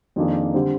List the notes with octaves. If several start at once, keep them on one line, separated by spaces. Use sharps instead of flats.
F2 D#3 A#3 D4 G#4
D3 G3 C4